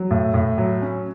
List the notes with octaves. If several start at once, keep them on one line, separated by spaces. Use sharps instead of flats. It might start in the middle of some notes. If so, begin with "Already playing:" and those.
Already playing: F#3
A2
A2
F#3
C#4